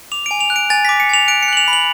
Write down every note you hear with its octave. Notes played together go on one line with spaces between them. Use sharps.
D6 F7
G#5 D7
F7
F#6
D7
G#5 A6
D6 B6
C#7
G#5 F7
F#6 D7
C#7
F#6 F#7
F7
B5
F#7